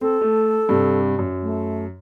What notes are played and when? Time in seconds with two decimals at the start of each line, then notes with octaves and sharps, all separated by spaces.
0.01 C4 A4
0.21 A3
0.69 G2 C3
1.19 F#2
1.42 A3